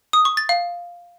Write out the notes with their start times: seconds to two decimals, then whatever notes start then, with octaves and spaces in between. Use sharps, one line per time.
0.13 D#6
0.25 C#6
0.37 A6
0.49 F5